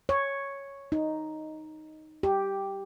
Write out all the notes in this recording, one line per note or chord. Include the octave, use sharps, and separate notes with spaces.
C#5
D#4
G4